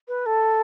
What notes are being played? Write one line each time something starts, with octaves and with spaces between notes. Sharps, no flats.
B4
A4